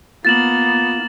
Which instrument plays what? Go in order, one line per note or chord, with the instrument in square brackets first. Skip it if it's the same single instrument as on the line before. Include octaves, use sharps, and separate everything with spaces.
[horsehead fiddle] A#3 [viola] B3 [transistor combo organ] F4 [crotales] A6 E7 F#7